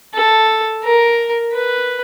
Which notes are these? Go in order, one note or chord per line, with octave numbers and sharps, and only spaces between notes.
A4
A#4
B4